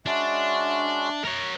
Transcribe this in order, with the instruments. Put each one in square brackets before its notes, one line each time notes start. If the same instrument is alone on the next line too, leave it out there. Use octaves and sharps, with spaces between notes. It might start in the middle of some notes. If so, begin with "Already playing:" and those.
[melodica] G#3 C#4 F#4 [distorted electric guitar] D4 [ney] E5
[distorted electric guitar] A#4 C#5